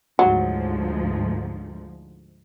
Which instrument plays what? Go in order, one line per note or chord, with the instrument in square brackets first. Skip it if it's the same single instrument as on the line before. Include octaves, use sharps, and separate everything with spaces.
[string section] D2 G#2 F3 [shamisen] F#3